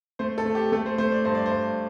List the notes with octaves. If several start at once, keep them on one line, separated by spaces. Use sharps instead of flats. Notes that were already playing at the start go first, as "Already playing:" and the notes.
A3 C5
A4
A3
G4
A3 A4
C5
A3 C5
D5
G2 C5
D5
C5
G2